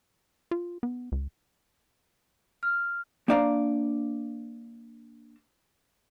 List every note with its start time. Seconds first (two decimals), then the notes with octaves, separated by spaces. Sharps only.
0.51 F4
0.83 B3
1.12 C#2
2.63 F6
3.28 A#3 D4 C5 D5 F5 A#5